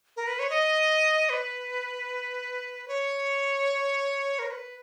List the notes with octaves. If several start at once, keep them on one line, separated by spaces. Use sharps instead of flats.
A#4
B4
C#5
D#5
B4
C#5
A#4
C#5
B4